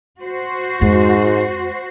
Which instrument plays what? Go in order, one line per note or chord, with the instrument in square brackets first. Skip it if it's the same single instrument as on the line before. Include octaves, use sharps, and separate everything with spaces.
[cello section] F#4 C5
[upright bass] F2 G#3 [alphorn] G#2